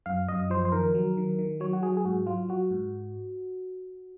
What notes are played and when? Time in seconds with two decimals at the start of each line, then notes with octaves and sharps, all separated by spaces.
0.06 F#2 F5
0.28 F#2 D#5
0.50 F3 C5
0.65 C5
0.72 D#3 A#4
0.95 F#3
1.17 D#3
1.39 D#3
1.60 F#3 C#5
1.73 F#4
1.82 F#3 G#4
1.97 G#4
2.05 G#2 F#4
2.26 F#3 F4
2.49 F#3 F#4
2.71 G#2